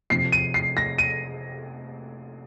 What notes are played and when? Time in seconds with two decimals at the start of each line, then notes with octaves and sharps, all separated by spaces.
0.10 F2 C3 F3 C7
0.32 D#7
0.54 C7
0.77 A#6
0.98 D#7